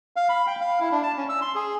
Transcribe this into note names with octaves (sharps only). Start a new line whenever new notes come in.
F5
B5
G5
F5
E4
D4
A5
C#4
E6
C6
G#4